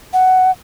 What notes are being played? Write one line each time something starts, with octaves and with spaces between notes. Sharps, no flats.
F#5